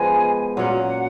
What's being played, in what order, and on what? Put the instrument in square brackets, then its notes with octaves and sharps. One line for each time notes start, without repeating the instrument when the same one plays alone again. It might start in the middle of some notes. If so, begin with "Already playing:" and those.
Already playing: [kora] F3 G#3 B3 [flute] G#5
[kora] A#2 F#3 A#3 C#4 [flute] F#5